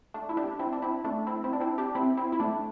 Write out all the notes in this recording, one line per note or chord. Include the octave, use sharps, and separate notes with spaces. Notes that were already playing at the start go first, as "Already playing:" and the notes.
A3 D4
E4
D4 G4
C4 E4
D4
C4 E4
A3 D4
C4 E4
C4 E4
D4
C4 E4
D4 G4
C4 E4
C4 E4
E4
A3 D4